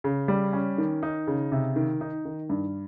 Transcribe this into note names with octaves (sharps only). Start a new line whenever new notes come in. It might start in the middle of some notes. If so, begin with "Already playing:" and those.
C#3
G3
C#4
D#3
D#4
C#3
C3
D#3
D#4
D#3
G2